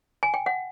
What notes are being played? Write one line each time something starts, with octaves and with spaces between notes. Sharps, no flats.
G#5
G5
F#5